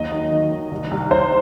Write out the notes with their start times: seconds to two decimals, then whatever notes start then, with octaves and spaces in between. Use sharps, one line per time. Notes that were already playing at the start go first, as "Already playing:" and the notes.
Already playing: D#2 F#3 D#5
0.12 D#3
0.32 D#3
0.51 D#3
0.71 C2
0.91 C2
1.11 C2 C5